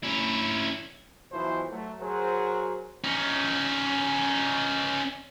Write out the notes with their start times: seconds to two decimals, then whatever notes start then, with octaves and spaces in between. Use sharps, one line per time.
0.03 C#4 E4
1.31 B1 B2 E3 F3 E4 C5
1.70 F#3 A3
2.00 F#3 F#4 G#4 A#4 C5
3.04 C#4 D#4